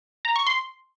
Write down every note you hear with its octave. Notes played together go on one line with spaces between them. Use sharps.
A#5
C#6
C6